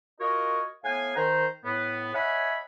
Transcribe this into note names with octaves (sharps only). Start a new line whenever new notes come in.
F4 F#4 A#4 C#5 D#5
A2 B3 F5 F#5 G#5
D#3 C5 A#5
A2 B3
C#5 D#5 E5 F#5 G#5 B5